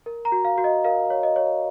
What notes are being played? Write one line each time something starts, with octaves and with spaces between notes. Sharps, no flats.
A#4
A#5
F#4
F5
F#4
D#5
A#4 F5
C#5
D#5
C#5